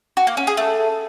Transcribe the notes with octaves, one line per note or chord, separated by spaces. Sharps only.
F#4
A#3
C#4
G#4
A3